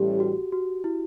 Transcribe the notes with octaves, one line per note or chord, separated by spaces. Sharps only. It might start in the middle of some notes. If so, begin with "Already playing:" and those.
Already playing: A1 A2 G3 G4
F#4
F#4
E4